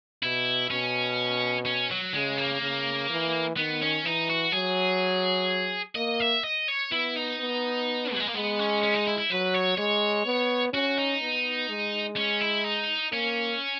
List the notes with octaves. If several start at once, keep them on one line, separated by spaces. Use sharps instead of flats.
B2 E4
B2 C#4
C#4
F#3
C#3 G#3
A#3
C#3
E3
D#3 B3
C#4
E3 D#4
F#4
F#3 G#4
A#3 D#5
E5
D#5
C#5
B3 E4
D#4
B3
F#3
G#3
A#3
G#3 B3
C#4
C#4
D#4
E4
E4
F#3 B4
C#5
G#3 C#5
B3
C#4 F#4
D#4
B3
G#3
C#4
E4
D#4
A#3 C#4